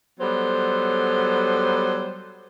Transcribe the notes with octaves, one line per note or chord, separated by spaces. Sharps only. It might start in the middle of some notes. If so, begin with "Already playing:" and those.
F#3 G3 B3 A4 C5